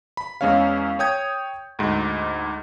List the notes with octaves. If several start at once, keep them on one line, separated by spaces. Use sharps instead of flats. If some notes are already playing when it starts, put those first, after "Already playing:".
B5
E2 G#3 C#4 C#5 F5
C#5 G5 D#6 G6 G#6
D2 G#2